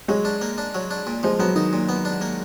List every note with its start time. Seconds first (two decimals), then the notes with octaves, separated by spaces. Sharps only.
0.08 F#3 G#3
0.25 D4
0.41 A#3
0.58 D4
0.75 F#3
0.91 D4
1.07 A#2
1.23 F3 G#3
1.39 F#3 B3
1.55 D#3 D#4
1.73 A#2
1.89 B3
2.05 D4
2.21 A#3